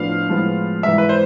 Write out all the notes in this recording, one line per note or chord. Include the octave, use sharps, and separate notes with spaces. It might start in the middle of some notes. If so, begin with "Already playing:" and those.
Already playing: A2 F3 B3 D4 F4 F5
A2 F3 G#3 B3 F4
G#2 E3 B3 E5
B4
C5